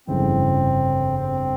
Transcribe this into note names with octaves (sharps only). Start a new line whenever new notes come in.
G1 F2 C#3 E3 C4
C4